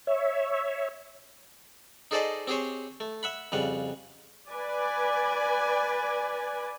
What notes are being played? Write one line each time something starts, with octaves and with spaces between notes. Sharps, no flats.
C#5 E5
D#4 G#4 A4 C5 D5 D#5
C4 G4 G#4 C5 C#5
A3
E5 F#5 B5
F2 C#3 G3 F#5
B4 D5 G#5